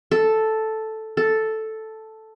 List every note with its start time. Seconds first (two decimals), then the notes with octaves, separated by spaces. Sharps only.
0.11 A4
1.17 A4